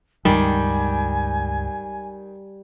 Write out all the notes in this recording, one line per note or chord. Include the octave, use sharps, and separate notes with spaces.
C#2 G2 D#3 G3 G#3 G#5